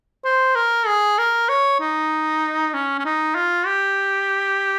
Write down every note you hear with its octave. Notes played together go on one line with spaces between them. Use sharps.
C5
A#4
G#4
A#4
C#5
D#4
C#4
C#4
D#4
F4
G4